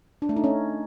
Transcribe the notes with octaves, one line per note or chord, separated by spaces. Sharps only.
D4
A3
D#4
C#4